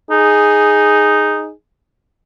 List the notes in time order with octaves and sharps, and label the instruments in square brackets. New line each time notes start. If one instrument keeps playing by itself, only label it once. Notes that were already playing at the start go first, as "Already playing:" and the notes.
[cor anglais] D#4 [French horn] G#4